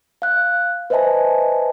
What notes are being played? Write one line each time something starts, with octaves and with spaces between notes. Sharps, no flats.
F5 F#6
B4 C5 D#5 E5 G#5 A5